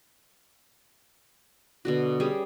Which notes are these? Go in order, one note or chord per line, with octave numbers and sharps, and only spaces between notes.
B2 D3 F#4
G3 C#4 G#4